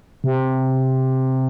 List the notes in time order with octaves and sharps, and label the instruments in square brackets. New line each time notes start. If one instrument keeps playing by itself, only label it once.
[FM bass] C3